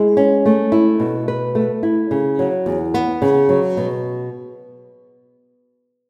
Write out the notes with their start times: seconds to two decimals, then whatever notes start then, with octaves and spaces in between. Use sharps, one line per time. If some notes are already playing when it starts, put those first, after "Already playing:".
Already playing: G#3 E4
0.17 C#4
0.46 A3
0.72 E4
1.00 B2
1.28 B4
1.55 A3
1.83 E4
2.11 C#3
2.39 F#3
2.66 E2
2.94 B3
3.22 C#3
3.49 F#3
3.77 B2